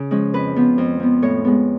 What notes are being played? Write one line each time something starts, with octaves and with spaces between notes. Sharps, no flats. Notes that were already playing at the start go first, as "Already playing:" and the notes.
Already playing: C#3
F3 G#3 C#4
F2 B4
F3 B3
F2
F3 B3
A2 C#5
G#3 B3